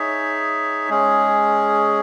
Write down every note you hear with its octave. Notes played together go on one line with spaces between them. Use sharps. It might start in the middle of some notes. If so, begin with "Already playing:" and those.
Already playing: D#4 G#4 C#5 E5
G#3 C#4 G#4